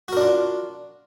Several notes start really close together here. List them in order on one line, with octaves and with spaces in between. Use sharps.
F#4 A#4 D4 F4